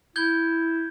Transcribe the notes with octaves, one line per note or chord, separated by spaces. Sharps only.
E4 G6 G#6 G7